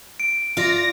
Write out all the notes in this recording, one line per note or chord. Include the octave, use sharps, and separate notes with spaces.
D7
F4 D5 A#6